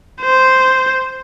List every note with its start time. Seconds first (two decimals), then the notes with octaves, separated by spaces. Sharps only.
0.21 C5